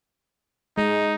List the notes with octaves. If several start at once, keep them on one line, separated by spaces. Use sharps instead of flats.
G#3 D#4